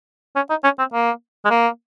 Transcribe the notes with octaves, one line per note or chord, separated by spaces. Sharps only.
C#4
D#4
C#4
C4
A#3
G#3
A#3